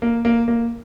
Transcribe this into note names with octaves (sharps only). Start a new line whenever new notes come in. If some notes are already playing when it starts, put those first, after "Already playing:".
A#3
A#3
A#3